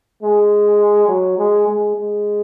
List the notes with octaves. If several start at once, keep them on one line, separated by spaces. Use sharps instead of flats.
G#3
F#3
G#3
G#3
G#3